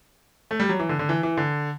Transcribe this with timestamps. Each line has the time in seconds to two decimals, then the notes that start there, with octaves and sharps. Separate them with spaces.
0.51 A3
0.60 G3
0.69 F#3
0.79 E3
0.89 D3
0.99 D3
1.09 E3
1.23 E3
1.37 D3